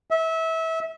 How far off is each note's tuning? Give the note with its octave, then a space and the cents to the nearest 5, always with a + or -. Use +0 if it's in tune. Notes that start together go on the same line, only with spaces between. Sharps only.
E5 -25